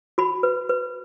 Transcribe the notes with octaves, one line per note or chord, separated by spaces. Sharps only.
F#4 B5
B4
B4